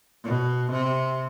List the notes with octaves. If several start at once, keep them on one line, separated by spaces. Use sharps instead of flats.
B2
C3